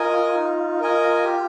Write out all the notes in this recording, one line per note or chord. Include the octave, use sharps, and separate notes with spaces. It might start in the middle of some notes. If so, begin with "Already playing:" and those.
Already playing: F4 A#4 D#5 G#5
D#4
A#4 D#5 G#5
G4